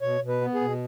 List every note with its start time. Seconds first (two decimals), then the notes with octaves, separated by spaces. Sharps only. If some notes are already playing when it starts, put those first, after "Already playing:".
0.01 B2 C#5
0.21 B2
0.28 B4
0.41 B3
0.54 G#4
0.61 B2